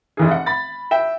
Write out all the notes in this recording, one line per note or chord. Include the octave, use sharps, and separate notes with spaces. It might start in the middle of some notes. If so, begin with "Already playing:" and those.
F1 E3 G#4
F#5
B5 A6
E5 G5